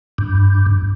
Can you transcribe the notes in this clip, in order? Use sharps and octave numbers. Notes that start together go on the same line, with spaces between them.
G2